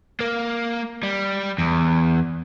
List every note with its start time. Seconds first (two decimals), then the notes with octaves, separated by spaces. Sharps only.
0.21 A#3
1.03 G3
1.58 E2